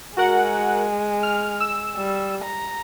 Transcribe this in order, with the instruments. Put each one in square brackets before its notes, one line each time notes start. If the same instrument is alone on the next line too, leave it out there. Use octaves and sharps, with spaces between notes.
[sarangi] G#3 [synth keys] F#4 A#4 F#5
[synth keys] F6
E6
[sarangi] G3
A#5